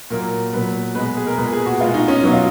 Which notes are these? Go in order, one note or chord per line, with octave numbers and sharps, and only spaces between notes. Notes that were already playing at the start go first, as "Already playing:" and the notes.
A#2 F#3 A#3 A#4
A#2 F#3 B3 B4
B2 G#3 B3 B4
B4
G#4
A#4
A#2 G#3 B3 B4
G#4
F#4
B2 G#3 B3 F4
D#4
C#4
B2 F#3 B3 D#4
F4